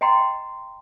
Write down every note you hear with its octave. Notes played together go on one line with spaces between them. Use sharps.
D#5 F#5 G5 A#5 C6